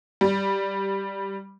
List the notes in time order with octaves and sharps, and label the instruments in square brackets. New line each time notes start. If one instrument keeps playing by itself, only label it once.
[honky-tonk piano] G3